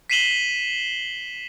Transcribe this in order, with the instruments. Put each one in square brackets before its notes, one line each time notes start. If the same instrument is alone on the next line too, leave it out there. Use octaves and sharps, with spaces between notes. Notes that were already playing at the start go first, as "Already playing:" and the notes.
[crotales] B6 C7 D#7 E7 F#7 G7